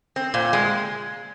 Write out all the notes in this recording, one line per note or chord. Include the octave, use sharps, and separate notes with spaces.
C4
A#2
G#3